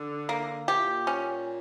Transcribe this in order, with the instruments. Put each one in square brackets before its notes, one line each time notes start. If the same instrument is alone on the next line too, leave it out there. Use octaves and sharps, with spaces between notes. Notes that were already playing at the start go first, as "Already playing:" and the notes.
Already playing: [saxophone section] D3
[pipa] A#3
[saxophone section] A#2 [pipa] G4
[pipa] C#4